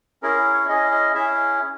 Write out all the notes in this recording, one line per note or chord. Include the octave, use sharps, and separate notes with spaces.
C#4 E4 G#4 A#4
C#5
C#4 E4 G#4 D#5
D#5
C#4 E4 G#4 E5